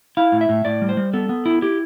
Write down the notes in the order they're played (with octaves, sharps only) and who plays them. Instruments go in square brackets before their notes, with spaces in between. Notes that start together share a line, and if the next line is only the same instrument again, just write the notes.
[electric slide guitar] E4 F5
A2
E5
A2
A2 D5
G3
C5
G3
B3 A4
B3
E4
E4 G4